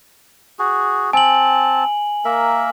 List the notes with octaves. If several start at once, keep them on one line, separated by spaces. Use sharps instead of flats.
F#4 G#4
C4 G#5 A5 F#7
A#3 A#4 E5